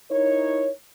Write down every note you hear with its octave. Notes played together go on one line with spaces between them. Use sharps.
D#4 E4 A#4 C#5